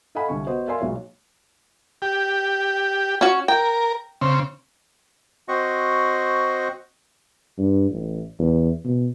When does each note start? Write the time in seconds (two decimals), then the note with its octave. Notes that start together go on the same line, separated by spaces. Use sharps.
0.15 A4 D#5 F5 F#5 G#5 B5
0.28 C2 D3 G#5 C#6
0.47 B3 F#4 C5 D#5
0.67 A#4 D5 E5 F5 G#5 C6
0.80 B1 A#2 G#3 F#4 C#5
2.02 G4
3.21 C#4 F#4
3.48 A#4 G5
4.21 C#3 C4
5.48 C4 F#4 C5 D#5 C#6
7.58 G2
7.91 A1
8.39 E2
8.84 B2